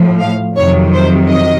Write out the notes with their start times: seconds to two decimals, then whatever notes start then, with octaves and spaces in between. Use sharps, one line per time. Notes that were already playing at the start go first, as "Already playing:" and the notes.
Already playing: A2 F3
0.20 F5
0.56 F2 C3 D#3 F#3 C#5
0.93 C5
1.29 D#5